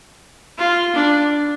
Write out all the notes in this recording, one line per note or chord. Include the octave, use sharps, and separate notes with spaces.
F4
D4